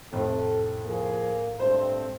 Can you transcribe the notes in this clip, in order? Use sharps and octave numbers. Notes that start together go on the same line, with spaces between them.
F1 A2 A4
F3 A#3 G#4
G2 G#3 A3 C4 C5